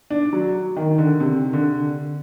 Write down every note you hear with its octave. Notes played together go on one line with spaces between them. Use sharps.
D4
F#3
D#3
D3
C3
D3